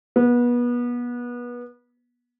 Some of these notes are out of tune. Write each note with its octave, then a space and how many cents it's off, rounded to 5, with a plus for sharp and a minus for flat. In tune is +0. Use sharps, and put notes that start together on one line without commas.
B3 -30